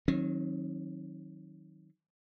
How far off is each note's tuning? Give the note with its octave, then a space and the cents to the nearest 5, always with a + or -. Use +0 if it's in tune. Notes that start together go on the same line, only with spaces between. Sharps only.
D#3 +15 F#3 +0 C4 +45